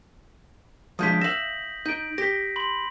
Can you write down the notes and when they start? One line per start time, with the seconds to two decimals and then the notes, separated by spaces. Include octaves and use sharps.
0.99 F3 G#3 D4 D#6 G6 B6
1.21 E5 F5 A#6 F#7
1.86 D#4 G6 D7
2.18 G4 A#6 B6
2.56 B5 C6 F#7